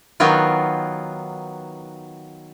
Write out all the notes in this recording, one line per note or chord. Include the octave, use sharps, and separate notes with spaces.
D#3 F#3 B3 F4